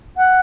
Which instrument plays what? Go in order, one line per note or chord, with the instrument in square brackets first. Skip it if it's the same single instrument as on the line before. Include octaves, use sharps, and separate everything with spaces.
[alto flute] F#5